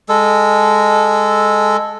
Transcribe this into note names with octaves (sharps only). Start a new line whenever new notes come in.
G#3 A4